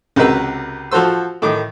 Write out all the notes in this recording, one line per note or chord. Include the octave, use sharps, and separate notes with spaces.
C#2 C3 F#4 A#4 B4 E6
F3 F#4 A4 C5 E6
A2 D#3 D6